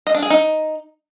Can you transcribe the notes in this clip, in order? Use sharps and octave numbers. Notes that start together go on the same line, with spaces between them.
D#5
D4
G#4
D#4